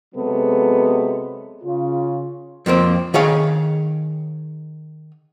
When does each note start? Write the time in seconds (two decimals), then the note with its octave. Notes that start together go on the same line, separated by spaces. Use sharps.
0.15 C3 F#3 G#3 B3 A4
1.63 C#3 F4
2.66 F2 F3 A#3 C4
3.14 D#3 G#4 C#5 F5